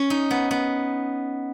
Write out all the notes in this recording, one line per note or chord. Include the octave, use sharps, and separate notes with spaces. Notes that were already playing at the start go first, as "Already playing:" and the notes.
Already playing: C#4
D#4
B3
B3